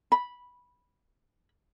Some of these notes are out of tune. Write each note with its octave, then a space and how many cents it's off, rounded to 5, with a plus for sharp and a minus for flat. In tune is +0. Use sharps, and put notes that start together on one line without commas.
B5 -10